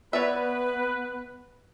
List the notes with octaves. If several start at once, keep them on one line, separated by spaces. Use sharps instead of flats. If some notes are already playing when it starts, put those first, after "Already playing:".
B3 B4 C#5 D5 E5